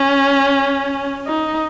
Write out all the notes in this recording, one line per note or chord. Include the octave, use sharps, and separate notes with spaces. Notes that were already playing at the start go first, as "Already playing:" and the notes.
Already playing: C#4
D#4